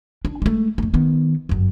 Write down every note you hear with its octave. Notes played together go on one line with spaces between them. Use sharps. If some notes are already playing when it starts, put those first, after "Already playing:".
D4
G#3 A3
F2 A3
D#3 B3
G1 F#2